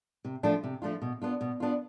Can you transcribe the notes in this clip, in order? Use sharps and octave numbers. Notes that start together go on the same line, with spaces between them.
C3
F3 A3 D4 F4
C3
F3 A3 D4 F4
B2
B3 D4 F4
B2
B3 D4 F4